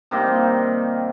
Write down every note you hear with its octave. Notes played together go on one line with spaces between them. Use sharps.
C3 D#3 G3 A#3